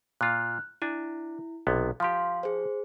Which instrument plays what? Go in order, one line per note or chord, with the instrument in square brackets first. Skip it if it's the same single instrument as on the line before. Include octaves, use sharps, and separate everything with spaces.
[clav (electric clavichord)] A#2 F4 [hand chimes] F6 F#6
[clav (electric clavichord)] D4 G#5 [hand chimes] E4
[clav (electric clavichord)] B1 C3 B3
[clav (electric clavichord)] F3 G4 [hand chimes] F5 C6
[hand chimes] G#4 C5